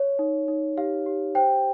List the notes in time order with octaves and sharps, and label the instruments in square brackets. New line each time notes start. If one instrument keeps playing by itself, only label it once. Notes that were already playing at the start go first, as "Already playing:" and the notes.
Already playing: [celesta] C#5
D#4
D#4
G4 F5
G4
C5 G5